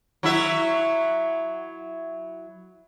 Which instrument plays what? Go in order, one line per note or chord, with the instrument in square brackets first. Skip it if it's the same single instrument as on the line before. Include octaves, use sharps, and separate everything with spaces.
[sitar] F#3 E4 E5